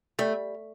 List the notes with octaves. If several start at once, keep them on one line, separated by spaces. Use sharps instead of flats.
G3 A3